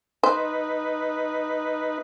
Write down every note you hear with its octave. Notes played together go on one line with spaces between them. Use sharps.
D#4 B4 C5